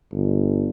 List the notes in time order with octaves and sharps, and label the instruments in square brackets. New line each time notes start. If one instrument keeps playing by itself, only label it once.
[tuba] G1